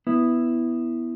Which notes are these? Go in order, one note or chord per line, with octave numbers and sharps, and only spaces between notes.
B3 E4